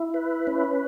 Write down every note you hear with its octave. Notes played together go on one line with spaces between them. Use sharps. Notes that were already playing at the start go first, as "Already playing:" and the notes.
Already playing: E4
B4
C#4